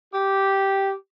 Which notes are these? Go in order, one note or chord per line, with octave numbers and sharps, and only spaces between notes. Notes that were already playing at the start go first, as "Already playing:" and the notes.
G4